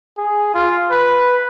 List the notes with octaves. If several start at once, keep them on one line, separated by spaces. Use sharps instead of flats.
G#4
F4
B4